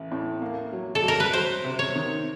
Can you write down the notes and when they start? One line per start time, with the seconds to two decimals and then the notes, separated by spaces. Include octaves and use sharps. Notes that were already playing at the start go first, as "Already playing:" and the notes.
Already playing: A1
0.12 A2
0.42 A#3
0.73 F#3
0.95 A4
1.02 F#3
1.08 A#4
1.20 B4
1.33 F#3 C5
1.65 C3
1.79 C#5
1.95 D#3